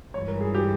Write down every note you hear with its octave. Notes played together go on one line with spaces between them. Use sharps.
G2 E3 G#3 C#5
A#4
G#4
G4